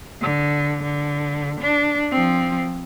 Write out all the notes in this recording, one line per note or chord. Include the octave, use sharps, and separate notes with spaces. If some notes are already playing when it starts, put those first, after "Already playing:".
D3
D3
D4
F3 C4